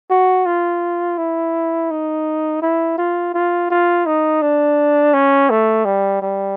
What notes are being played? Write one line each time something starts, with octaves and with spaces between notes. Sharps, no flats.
F#4
F4
E4
D#4
E4
F4
F4
F4
D#4
D4
C#4
A3
G3
G3